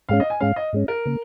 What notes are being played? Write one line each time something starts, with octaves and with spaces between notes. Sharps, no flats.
G#2 G#3 C#4 F5
D#5
G#5
G#2 G#3 C#4 F5
D#5
G#2 G#3 C#4
A#4
C#3 A#3